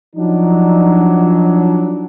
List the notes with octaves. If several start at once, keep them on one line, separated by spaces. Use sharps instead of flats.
F3 F#3 D4 D#4